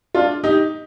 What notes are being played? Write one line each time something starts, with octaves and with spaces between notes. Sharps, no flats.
D4 F4
D#4 G4